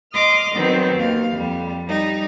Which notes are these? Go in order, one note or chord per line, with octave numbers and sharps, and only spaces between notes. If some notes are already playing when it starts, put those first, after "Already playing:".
D#5 C6 D6 D#6 F6
D#3 F#3 B3 C4
D#2 F5
F2 G3
G3 D#4